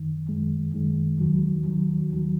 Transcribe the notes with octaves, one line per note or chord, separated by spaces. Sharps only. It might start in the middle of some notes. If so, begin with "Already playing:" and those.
Already playing: F#2 D#3
F#2 D#3 G#3
F#2 D#3 G#3
D#2 D#3 F#3
D#2 D#3 F#3
D#2 D#3 F#3